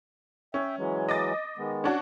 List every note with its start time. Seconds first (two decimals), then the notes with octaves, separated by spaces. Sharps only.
0.54 C#4 E5 G5
0.78 E3 F#3 G#3
1.09 D#5 D6 A6
1.58 D#3 G#3 B3
1.84 C#4 D4 F#4